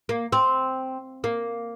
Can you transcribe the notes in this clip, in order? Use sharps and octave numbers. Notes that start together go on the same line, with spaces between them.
A#3
C4
A#3